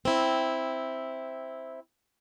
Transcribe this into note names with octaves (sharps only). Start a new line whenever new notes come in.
C4 E4